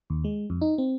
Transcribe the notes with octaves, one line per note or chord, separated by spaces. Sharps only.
D#2
G#3
F2
D#4
C4